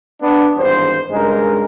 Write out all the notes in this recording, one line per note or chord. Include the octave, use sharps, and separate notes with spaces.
B3 D4
G#1 E2 G2 C5
C#2 G2 G#3 D#4 A#4